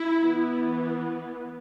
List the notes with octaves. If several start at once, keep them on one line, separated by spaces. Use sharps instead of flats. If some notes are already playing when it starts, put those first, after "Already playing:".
Already playing: E4
E3 B3